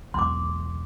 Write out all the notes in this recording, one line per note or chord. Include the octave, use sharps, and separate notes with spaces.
B1 E2 G#3 C6 D6